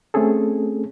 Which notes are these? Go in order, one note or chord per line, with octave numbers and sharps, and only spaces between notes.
A3 C4 C#4 G#4 A4